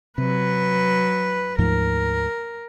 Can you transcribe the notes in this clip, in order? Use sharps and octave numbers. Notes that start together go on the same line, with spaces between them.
C3 F#3 B4
D2 G#2 F3 A#4